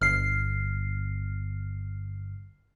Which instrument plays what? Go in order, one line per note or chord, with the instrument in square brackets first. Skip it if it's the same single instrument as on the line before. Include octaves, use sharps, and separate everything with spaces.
[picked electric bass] G1 [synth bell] F6 C7